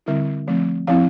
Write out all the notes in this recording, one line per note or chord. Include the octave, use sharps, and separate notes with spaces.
D3 G3 C4 E4 E5
F3 A3 C4
F3 C4 E4 F5